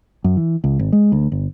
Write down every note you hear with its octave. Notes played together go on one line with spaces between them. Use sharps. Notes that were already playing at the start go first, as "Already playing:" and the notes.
F#2
E3
C#2
G#1
G#3
D2
G1